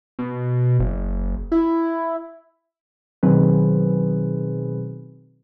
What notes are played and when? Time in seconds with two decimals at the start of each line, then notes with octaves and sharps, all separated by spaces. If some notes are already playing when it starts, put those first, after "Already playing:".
0.19 B2
0.80 F#1
1.52 E4
3.23 B2 D#3 F#3 C4 G#4 B4